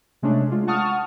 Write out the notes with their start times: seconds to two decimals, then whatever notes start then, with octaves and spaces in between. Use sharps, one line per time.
0.22 C3 G#3 A3 C#4 D4
0.51 G#3 F4
0.67 F#5 A5 C#6 D#6 F6